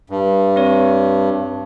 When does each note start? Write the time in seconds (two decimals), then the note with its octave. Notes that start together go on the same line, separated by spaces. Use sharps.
0.10 G2
0.56 C4 C#5